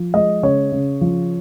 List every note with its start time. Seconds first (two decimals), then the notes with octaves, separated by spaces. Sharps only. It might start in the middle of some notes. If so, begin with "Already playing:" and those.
Already playing: F3
0.14 G#3 D#5
0.43 C#3 C#5
0.72 C#3
1.01 F3